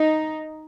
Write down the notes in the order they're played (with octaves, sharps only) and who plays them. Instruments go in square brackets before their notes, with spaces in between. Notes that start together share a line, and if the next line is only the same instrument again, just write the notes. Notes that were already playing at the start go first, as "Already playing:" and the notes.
Already playing: [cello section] D#4